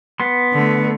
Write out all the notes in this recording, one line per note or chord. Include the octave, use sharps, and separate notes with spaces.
B3 C6
D3 A3